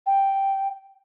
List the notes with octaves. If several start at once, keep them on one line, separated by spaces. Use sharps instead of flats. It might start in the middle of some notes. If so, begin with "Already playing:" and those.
G5